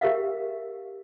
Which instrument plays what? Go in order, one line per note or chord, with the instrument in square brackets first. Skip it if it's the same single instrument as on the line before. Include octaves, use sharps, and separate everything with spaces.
[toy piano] G4 A#4 E5 F5